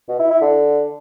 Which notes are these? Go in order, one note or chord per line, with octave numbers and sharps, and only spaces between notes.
B2
E4
E4
D3